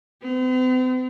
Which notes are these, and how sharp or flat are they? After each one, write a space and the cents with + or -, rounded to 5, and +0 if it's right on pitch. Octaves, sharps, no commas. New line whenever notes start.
C4 -45